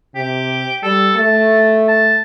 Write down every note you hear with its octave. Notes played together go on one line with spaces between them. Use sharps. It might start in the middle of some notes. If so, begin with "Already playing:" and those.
C3 G4
G3 A4
A3 A5
A5